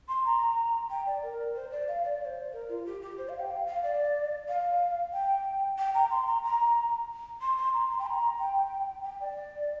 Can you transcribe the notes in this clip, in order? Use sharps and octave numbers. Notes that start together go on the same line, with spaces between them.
C6
A#5
G5
D5
A#4
C5
D5
F5
D5
D5
C5
A#4
F4
G4
G4
C5
F5
G5
F5
F5
D5
F5
G5
G5
A#5
C6
A#5
A#5
C6
C6
A#5
C6
G5
C6
A#5
G5
G5
D5